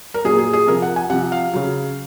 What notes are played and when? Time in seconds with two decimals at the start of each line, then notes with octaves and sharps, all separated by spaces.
0.14 A#4
0.25 A#2 F#3 G#4
0.38 G#4
0.53 G#4
0.67 C3 F3 A#4
0.82 F#5
0.96 G#5
1.10 C3 F3 F#5
1.32 F5
1.53 C#3 F#3